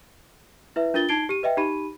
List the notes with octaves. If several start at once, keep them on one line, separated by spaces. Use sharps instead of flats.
E4 B4 E5
D4 F4 A#4 A6 G7
D#4 A5 G#6 C7 D7 G7
G4 D#7
B4 D#5 E5 G5
D#4 G4 B5 D#7